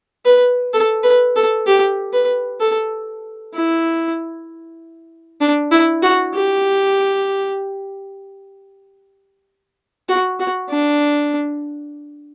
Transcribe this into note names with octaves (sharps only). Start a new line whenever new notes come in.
B4
A4
B4
A4
G4
B4
A4
E4
D4
E4
F#4
G4
F#4
F#4
D4